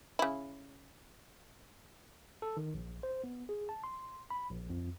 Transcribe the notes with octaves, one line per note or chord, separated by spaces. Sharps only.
C#3 E4
A4
D#3
A#1
C5
B3
G#4
A5
C6
B5
A#1
F2